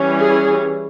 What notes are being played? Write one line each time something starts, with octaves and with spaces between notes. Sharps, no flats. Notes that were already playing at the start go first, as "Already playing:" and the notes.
Already playing: E3 G3 C#4
G#4